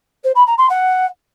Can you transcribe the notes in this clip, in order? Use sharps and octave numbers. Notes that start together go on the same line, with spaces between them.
C5
B5
A#5
C6
F#5